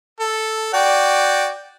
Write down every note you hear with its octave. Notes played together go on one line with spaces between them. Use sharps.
A4
F#4 D5 G5